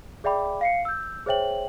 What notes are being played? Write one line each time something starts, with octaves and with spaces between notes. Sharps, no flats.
G#4 D5 E5 G5 B5 D6
F5 C7 C#7
E6 G6
G#4 C5 C#5 E5 G5 F#7